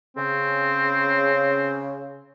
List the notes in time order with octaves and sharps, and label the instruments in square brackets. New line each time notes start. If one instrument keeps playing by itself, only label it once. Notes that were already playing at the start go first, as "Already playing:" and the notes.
[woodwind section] C#3 [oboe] C4